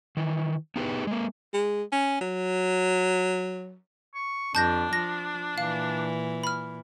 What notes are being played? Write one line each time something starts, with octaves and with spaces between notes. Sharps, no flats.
D#3 E3
B3 D#4 G4 G#4 B4
G#3 A#3
G#3
C#4
F#3
C#6
F2 D4 A5 G6 A#6
F3 A#6
A#2 E3 F5
B5 F6